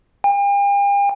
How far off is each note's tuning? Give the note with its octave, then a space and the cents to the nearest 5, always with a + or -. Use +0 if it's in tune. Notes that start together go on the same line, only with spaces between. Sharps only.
G5 +45